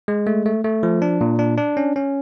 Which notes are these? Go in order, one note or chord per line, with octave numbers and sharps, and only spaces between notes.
G#3
A3
A3
A3
F3
D4
A#2
D4
D4
C#4
C#4